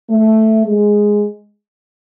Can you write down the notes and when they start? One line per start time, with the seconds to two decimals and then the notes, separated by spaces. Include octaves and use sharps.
0.10 A3
0.67 G#3